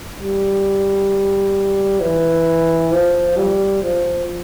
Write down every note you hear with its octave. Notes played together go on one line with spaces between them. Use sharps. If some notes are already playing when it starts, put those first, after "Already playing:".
G3
E3
F3
G3
F3